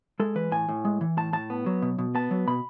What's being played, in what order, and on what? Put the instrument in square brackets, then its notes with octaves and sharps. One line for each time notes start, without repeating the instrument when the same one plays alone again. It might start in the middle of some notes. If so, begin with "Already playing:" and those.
[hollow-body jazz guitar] G#3 A4
E3 B4
A2 G#5
A2
G#3
E3
A2 A5
A2 A5
B3
F#3
B2
B2
B3 A5
F#3
B2 B5